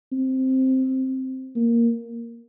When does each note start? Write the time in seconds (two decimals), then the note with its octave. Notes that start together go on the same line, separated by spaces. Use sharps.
0.13 C4
1.56 A#3